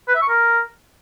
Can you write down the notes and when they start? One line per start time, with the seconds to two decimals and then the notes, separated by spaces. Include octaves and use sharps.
0.08 B4
0.15 E5
0.22 C#6
0.29 A#4